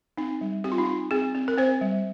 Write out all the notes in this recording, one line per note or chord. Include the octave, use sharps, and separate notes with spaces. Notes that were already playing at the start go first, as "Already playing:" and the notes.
C4 D#4
G3
C4 G4
F4
D#4
C4 F4
C4 G#4
C4
A#4
C4 C5
G3